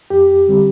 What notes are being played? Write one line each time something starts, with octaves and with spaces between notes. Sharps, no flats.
F2 G4
D3 G3 C4